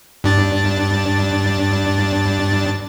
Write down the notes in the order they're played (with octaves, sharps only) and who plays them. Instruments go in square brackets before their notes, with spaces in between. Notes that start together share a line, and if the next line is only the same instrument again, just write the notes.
[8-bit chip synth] G2 D4 A6